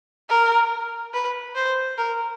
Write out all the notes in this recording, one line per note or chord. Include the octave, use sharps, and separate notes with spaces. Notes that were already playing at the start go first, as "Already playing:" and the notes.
A#4
B4
C5
A#4